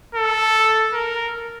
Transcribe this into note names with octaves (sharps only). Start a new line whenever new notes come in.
A4
A#4